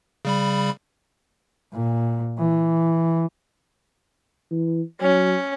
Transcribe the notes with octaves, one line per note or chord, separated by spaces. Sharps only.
C#3 G3 B5
A#2
E3
E3
F#3 C#4